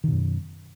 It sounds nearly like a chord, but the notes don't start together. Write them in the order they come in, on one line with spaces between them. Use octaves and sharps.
D#3 B2 F#2